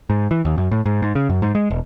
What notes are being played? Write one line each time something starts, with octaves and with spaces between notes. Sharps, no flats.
G#2
E3
D#2
F#2
A2
G#2
G#2
C#3
F#2
G#2
G#3
E1